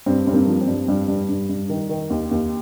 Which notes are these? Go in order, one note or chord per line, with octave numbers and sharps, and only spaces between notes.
G2 C4
G2 C4
A#3 D4
F3
C4
G2
G2
G2
G2
G2
D#3
D#3
D#2
D#2